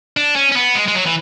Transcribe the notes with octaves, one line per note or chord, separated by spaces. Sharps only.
D4
C#4
C#4
B3
G#3
G#3
F#3
E3